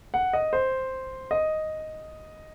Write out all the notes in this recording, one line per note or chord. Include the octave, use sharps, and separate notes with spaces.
F#5
D#5
C5
D#5